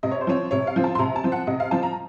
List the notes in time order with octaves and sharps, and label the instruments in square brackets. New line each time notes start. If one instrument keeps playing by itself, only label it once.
[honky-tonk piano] C3 D#5
C#5
C5
F3 C4 C#5
C3 C#5
F5
F3 C4
A5
C6
C3 A#5
A5
F3 C4
F#5
C3 D#5
F5
F3 C4 A5
A#5